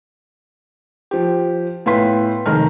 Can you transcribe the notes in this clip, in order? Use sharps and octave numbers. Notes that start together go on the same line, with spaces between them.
F3 G4
A2 B3 F5 G5 C6 B6
F1 D#3 A#5 F6